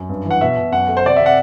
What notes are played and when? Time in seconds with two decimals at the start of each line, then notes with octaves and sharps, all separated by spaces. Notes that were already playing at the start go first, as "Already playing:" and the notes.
Already playing: F#2
0.09 G2
0.25 E3
0.31 F#5
0.41 B2 E5
0.57 B2
0.72 F#2 F#5
0.88 A3
0.97 C5
1.04 C3 D5
1.16 C3 E5
1.26 F#5